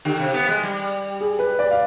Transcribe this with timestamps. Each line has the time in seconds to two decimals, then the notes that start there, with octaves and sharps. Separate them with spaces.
0.05 D3 G4
0.20 C3
0.34 B3
0.49 G#3
0.63 G3
1.21 G#4
1.39 B4
1.59 D5
1.71 F5